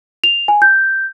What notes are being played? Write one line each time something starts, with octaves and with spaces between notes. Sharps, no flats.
F7
G#5
G6